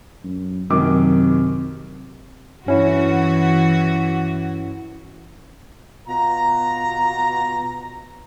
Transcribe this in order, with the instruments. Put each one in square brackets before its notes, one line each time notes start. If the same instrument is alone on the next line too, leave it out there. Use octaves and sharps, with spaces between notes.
[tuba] F#2
[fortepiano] F#2 D#3 D6 [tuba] C3
[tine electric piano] G2 C#4 E4 [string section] E3 F#4
[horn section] B2 F4 A#5